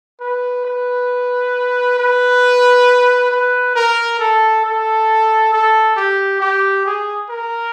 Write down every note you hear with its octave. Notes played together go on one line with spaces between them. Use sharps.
B4
B4
B4
B4
A#4
A4
A4
A4
G4
G4
G#4
A#4